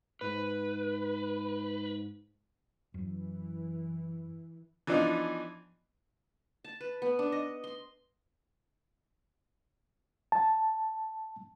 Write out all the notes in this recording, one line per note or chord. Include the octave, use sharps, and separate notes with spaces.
G#2 B4
F#2 E3
E3 F3 B3 D4 D#4
A5
B4
B3
D4
D#5
C6
A5